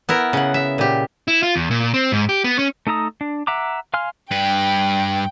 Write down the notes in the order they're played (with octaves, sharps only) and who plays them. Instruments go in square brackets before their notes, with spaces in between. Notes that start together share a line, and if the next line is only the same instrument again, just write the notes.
[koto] B3 E4 A#4
C#3 F#5
E5
A#2 G4
[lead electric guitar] E4
F4
E2
A#2
C4
G#2
G4
B3
C#4
[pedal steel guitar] A3 D#4 A4 A#5 D#6
D4
E5 F#5 A#5 D6
F5 G#5 C6 F6
[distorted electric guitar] G2 B4 [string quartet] G5